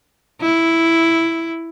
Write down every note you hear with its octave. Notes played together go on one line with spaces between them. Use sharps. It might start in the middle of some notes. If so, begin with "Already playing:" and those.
E4